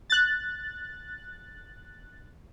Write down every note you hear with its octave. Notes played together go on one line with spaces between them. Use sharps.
F#6 A6